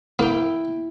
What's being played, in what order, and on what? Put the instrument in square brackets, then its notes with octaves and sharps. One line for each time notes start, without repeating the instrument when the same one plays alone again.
[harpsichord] A#3 [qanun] E4 G5